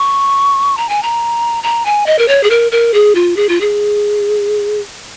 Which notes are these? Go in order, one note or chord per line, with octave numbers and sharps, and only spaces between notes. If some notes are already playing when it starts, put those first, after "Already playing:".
Already playing: C#6
A#5
G#5
A#5
A#5
G#5
D#5
A#4
C#5
G#4
A#4
A#4
G#4
F4
G#4
F4
G#4